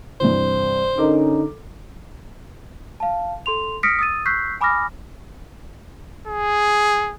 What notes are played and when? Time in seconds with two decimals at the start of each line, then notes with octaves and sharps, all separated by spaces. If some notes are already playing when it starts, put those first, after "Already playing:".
0.20 G2 C3 E3 C5
0.98 D3 C#4 D#4 A4 A#4 D6
3.00 F5 A5
3.46 A4 C6 F7
3.83 D#6 F6 A#6 B6 C#7 D7
3.99 D#6 E6 A6 D#7
4.26 C#6 E6 F#6 G6 B6 C7
4.61 G#5 B5 D6 D#6 F6 A#6
6.27 G#4